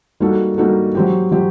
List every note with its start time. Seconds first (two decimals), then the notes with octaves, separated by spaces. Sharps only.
0.20 G3 A#3 D#4 F#4 A4
0.58 G3 A#3 D#4 F#4 A4
0.95 F#3 C4 G4
1.32 F#3 C4 G4